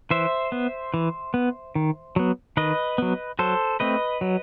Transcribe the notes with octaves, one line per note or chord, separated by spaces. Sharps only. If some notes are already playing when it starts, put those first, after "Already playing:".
E3 C5 E5
B3
E3
B3
D#3
F#3 B3
D#3 B4 D#5
F#3 B3
F#3 A4 C5
A3 C4 B4 D#5
F#3